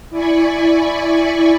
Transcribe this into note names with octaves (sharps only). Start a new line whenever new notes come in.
E4 D5 G#5 B5 C#6